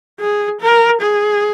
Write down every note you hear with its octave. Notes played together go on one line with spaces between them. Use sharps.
G#4
A#4
G#4